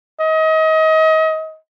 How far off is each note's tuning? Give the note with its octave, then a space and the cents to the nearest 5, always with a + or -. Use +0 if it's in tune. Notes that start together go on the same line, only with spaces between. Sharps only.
D#5 +30